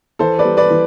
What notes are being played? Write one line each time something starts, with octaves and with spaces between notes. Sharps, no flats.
E3 A4 C5
B4 D5
G3
B4 D5
E3